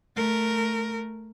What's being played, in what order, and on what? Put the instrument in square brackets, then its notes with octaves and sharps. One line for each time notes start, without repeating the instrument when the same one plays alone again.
[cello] A3 A#4